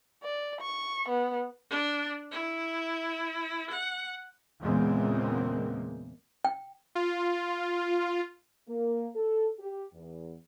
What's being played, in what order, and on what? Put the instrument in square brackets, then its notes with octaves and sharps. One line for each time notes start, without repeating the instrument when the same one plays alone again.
[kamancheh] D5
C#6
B3
[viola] D4
E4
F#5
[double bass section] E2 A#2 C#3 G#3 A#3 C4
[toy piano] G5
[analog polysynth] F4
[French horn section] A#3
A4
G4
E2